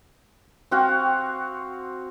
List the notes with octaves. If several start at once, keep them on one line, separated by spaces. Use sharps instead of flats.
C4 F#4 F5